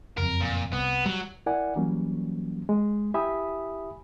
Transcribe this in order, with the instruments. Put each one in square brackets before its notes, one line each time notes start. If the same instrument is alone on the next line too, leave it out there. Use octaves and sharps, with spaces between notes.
[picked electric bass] F#1 F2 [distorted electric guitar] A#4
[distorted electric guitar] A#2
[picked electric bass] C2 [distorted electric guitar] B3
[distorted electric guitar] F#3 [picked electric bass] G3
[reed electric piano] E4 A#4 D5 F#5 G#5
E3 F#3 G3 A#3 C#4
G#3
E4 G4 E5 G#5 B5 D#6